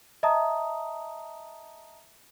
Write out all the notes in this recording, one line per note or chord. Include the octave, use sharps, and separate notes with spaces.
D#5 E5 A5 A#5 D#6